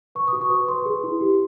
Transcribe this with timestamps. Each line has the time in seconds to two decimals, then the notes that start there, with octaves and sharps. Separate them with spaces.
0.15 B4 C#6
0.28 F#4 D#6
0.41 C#6
0.50 B4
0.67 B4 C6
0.86 G#4
1.03 E4
1.21 G4